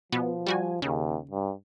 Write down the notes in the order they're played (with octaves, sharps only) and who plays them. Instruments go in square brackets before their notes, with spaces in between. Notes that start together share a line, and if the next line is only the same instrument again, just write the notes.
[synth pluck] B2 B3 [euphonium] F3
[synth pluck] G3 F#4 G#5
[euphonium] D#2 [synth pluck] C#3
[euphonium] G2